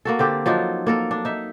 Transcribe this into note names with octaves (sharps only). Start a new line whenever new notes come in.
A#3 F#4 A4
D3 C4 G4
F3 F#3 D4 D#4
A#3 A4 A#4
D4
D#4 E5